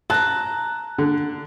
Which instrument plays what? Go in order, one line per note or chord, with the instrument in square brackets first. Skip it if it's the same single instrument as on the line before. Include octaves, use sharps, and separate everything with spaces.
[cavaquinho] A5 A#5 [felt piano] F#6
[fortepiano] D3